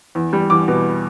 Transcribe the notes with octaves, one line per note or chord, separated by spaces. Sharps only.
E2
G3
E2 D6
B2